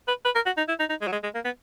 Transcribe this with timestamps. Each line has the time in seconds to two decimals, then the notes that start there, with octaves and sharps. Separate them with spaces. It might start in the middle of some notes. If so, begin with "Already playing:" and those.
0.08 B4
0.25 B4
0.35 A#4
0.46 F#4
0.57 D#4
0.69 E4
0.80 D#4
0.90 D#4
1.01 G#3
1.08 F#3
1.12 G#3
1.24 G#3
1.35 A#3
1.45 B3